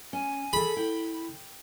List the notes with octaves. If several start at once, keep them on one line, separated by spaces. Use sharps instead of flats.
C#4 G#5
G#4 A4 B5
E4 G5